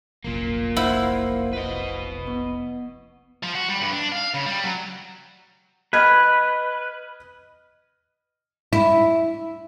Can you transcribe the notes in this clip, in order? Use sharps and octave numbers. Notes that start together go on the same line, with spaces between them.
F1 A#1 F#2 A#3 F4
E4 C5 F5 F#5
B4 D#5
B3
F3
F#4
G3
G2
D4
F5
C#3
G3
F#3
B4 D#5 F6 G#6
E4